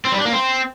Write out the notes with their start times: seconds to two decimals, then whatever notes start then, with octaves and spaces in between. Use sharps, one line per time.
0.05 C4
0.12 G3
0.19 D4
0.25 A#3
0.32 C4